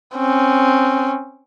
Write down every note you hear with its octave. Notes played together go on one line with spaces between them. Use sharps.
C4 C#4